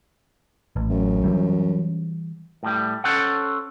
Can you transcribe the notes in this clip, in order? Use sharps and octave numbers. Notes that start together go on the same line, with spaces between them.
A1
F#2
E3 G3
A2 G3
C#4 A4 C5 F#5